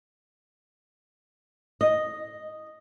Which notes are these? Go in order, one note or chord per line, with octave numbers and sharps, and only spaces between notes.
D#5